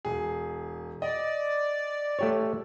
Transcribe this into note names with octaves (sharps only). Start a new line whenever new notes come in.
E1 G#4
D5 D#5
A3 G4 C#5